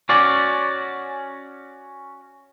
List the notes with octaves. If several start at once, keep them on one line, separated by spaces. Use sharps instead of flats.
C#4 F#4 D5